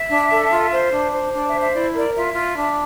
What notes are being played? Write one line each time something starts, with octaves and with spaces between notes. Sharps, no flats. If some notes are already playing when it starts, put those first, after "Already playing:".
Already playing: E5
D4
A4
F4
C5
D4
C5
D4 D5
E5
C5
E5
E4 D5
A#4 D5
F4 E5
F4
D4